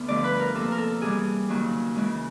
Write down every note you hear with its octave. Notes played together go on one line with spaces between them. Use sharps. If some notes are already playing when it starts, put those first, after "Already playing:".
Already playing: D2 B3
G2 D3 F3 A3 D5
B4
A#4
C3 F3 A#3 A4
A#4
A4
C3 E3 G3 G#4
D#2 C#3 F#3 A#3
C#3 E3 G#3 C#4